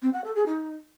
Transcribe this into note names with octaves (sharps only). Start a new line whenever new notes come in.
C4
F#5
A4
G#4
D#4